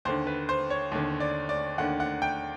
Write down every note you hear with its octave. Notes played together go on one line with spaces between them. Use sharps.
D#2 D3 C5
B4
C5
C#5
D#2 D3
D5
D5
D#2 D3 F#5
F#5
G5